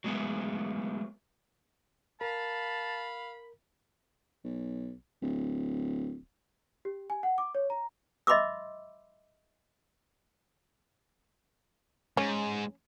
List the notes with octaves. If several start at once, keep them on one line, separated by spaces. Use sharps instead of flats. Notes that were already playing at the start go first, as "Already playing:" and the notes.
F#3 G#3 A3 B3
A#4 F5 A5 B5
B1
D1
G4
G#5
F#5
D6
C#5
A#5
D#5 E5 B5 C6 D6 E6
G#2 C#4